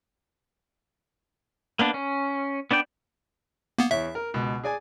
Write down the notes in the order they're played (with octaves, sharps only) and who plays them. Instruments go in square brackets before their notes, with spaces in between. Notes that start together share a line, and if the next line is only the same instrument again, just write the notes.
[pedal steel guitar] A#3 B3 D4
C#4
B3 D4 D5 G5
[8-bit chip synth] A#3 B3
[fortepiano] E2 C#5 [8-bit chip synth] E5
[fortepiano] A#4
C#2 B2
G#4 D5 G#5